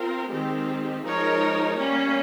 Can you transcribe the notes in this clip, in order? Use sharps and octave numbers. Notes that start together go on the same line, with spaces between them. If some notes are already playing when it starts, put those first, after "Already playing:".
Already playing: C4 F4 A#4
D#3 G#3 C4 G4
F3 G#3 D#4 A#4 C#5
G3 A#3 C#4